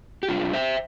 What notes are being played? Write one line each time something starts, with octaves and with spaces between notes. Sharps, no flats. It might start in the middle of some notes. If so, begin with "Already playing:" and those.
G4
C3 G3 D4 F4
C5 E5